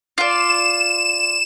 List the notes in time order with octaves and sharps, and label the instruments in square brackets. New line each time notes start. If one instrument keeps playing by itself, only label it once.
[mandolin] F4 D5 [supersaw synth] E7